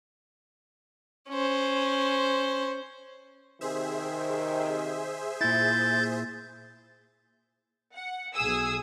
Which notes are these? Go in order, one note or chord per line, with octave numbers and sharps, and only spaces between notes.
C#4 C5
C3 D#3 G#4 C5 E5
A#2 E4 G6 A6
F#5
B1 G#4 G#5 D#6 E6